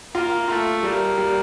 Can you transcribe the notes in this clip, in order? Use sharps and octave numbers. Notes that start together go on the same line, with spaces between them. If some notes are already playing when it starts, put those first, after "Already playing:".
A#3 F4
A3 F4
G3 A#3
G3